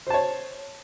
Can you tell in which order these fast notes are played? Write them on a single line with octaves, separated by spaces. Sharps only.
C5 A5 C#5